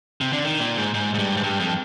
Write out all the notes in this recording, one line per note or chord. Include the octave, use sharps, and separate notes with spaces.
C3
D3
D#3
A#2
G#2
G#2
G#2
G2
G#2
G2
F2